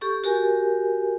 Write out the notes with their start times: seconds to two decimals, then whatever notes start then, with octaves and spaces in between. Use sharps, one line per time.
0.01 G4 A4 C#6
0.24 F#4 G4 A#4 G#5